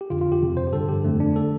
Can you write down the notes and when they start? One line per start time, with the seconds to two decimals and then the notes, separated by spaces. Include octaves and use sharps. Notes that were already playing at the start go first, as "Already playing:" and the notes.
0.01 G4
0.10 F2 D3 F4
0.21 F4
0.32 G4
0.42 F2 C3
0.57 C5
0.67 G4
0.72 G2 D3 A4
0.89 G4
1.04 F2 D3 A3
1.20 D4
1.36 D3 A4